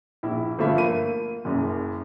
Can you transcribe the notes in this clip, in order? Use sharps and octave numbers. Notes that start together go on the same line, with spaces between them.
A#1 E4 E5
G1 F3 A3 F4 E5 B5
A#3 D#7
F#1 F#2